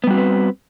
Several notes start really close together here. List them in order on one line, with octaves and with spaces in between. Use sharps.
B3 G3 F#4 C4 B4